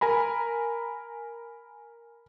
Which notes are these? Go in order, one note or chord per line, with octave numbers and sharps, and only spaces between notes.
A#4 G#5 A#5 B5